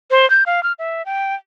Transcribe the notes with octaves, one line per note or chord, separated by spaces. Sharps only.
C5
G6
F5
F6
E5
G5